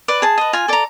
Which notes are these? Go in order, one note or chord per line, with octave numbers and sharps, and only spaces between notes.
B4 D5
G#4 A5
B4 D#5
F4 G#5
A4 D5 A#5